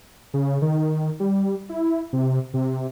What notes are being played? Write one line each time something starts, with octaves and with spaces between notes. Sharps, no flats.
C#3
D#3
G3
E4
C3
C3